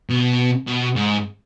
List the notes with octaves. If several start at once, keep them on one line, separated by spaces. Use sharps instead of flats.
B2
B2
G#2